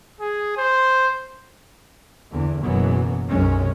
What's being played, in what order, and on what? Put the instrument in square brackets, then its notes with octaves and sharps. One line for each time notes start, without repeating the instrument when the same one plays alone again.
[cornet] G#4
C5
[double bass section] E2 D3
F#1 F#2 B2 E3 F#3 B3
B1 F#2 C3 G#3 C#4